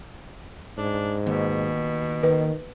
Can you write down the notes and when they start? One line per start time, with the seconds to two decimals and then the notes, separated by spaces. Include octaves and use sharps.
0.77 G#2 D4
1.27 D#2 B2
2.23 D#3 B4